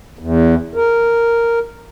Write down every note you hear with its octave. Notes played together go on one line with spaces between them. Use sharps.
E2
A#4